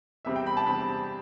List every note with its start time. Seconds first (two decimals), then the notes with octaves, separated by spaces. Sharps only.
0.25 E2 C3 G3 C4 E5
0.36 G5
0.46 B5
0.57 A5
0.66 E2 C3 G3 C4 B5